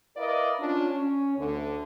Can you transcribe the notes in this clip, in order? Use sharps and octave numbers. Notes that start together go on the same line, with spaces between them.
E4 A#4 B4 D5 D#5 F5
C#4 D4 F4
C#4
D2 D3